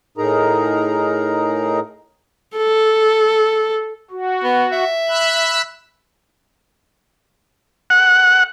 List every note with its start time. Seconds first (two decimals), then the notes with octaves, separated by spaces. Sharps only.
0.18 A2 D#4 G#4 A#4 A#5
2.57 A4
4.11 F#4
4.44 B3
4.72 E5
5.09 B5 E6 F#6
7.90 F#5